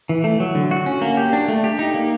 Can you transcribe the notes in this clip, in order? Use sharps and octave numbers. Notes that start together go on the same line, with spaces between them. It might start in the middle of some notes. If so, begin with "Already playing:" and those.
E3
A3
F#3
D3
F#4
C#4
A#3
G4
D4
A3
G4
D#4
A#3